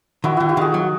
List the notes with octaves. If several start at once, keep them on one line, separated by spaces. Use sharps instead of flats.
D#3 E4 F#4
D#3 E4 F#4
F4 G4
D#3 F#4 G#4
F#3